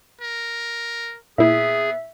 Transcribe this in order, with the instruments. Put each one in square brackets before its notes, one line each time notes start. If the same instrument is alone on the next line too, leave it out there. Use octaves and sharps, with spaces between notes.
[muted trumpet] A#4
[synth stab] A#2 E4 [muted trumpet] B3 [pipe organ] G#4 [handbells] E5